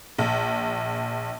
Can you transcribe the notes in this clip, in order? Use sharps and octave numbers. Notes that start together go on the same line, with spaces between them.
A#1